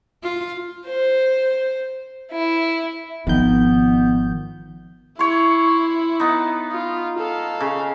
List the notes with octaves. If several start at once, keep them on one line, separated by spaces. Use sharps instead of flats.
F4
C5
E4
G#1 D#3 F3 B3 G6
E4 C#5 C6
B3 D#4
F4
A4 F5
C#3